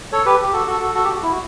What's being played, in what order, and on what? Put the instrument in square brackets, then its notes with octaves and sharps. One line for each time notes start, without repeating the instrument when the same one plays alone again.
[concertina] A4 C#5
G4 B4
G4
F#4 A4
F#4 A4
F#4 A4
F#4 A4
G4
F#4
E4
F#4